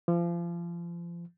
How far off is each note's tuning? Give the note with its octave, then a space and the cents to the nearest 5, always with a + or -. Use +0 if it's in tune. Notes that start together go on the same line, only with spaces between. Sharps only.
F3 -30